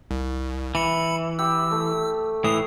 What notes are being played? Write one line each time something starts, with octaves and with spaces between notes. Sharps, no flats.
C2
E3 B5 C#7
G4 E6
A3
A2 E3 D#6 C7